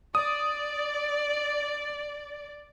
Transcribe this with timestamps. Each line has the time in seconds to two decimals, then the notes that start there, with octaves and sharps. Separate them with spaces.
0.15 D5 D#6